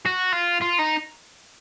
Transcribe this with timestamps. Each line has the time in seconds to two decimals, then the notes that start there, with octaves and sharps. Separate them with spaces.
0.06 F#4
0.32 F4
0.61 F4
0.79 D#4